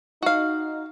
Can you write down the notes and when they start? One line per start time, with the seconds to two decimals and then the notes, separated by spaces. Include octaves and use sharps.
0.23 D#4 F#4 F5